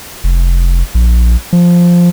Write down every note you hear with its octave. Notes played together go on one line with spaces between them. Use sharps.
F1
A#1
F3